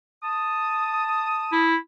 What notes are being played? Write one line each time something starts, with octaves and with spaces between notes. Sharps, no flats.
A5 D#6
E4